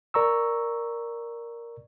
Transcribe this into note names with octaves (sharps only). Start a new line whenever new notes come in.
A#4 D5 A#5 C#6 E6